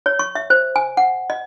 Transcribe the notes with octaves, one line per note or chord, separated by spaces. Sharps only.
C#5
C#6
E5
C5
G#5
F#5
D#5